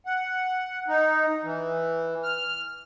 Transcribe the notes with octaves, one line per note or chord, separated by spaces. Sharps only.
F#5
D#4
E3
F6